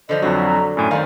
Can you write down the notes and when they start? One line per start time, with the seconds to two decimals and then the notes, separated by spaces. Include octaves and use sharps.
0.09 D3 F3 G3 D#5
0.22 F2 D3 F#3 F#4
0.46 A#5
0.77 F#2 A2 G#5
0.91 D#3 G3 C4 F5 A#5